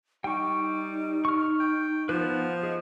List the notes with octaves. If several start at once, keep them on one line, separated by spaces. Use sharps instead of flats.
G3 D#4 G5 C#6
C#6 F6
G5
F3 B3 B4
G#4 D#5